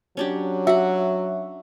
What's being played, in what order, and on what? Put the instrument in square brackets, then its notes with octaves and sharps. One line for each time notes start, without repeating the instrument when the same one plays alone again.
[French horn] F#3 [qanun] C#4 D4 G4
[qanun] F#4 F#5 [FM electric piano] E5